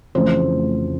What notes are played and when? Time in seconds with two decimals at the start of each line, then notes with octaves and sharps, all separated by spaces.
0.15 F1 F2 C#3 E3 A3 C5